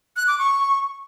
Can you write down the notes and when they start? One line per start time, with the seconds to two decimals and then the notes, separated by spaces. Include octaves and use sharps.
0.16 F#6
0.28 D6
0.39 C#6